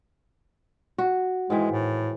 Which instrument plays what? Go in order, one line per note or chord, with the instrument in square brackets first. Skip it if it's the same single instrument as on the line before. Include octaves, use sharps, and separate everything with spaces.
[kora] F#4
[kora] G#2 D#3 E3 [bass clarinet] G#3
[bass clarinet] A2